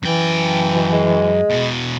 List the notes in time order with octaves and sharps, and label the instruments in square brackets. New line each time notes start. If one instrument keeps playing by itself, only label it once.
[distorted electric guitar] F#2 G5 [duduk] E3
[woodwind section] B2
G#3
[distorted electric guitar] E2 B2